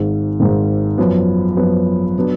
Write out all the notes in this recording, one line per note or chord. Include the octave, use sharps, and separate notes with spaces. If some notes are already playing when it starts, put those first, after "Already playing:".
Already playing: G#1 G#2 D#3
G#1 G#2 D#3
F#2 F3 B3
F#2 F3 B3
F#3 B3 D4